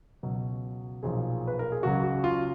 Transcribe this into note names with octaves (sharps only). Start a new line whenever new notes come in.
C#2 B2 F#3
B1 A#2 F3 G#4
B4
A#4
G#4
C#2 C#3 F#3 F#4
F#4
F4